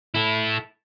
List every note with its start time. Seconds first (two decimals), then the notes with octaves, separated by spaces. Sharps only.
0.15 E4 A4